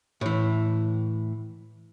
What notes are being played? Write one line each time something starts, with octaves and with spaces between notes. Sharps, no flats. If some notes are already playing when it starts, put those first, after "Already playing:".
A2 E3